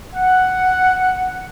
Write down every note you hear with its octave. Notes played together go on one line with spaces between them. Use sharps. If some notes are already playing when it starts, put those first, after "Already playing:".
F#5